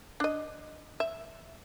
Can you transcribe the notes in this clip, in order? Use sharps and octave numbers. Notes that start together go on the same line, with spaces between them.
D4 D#5
E5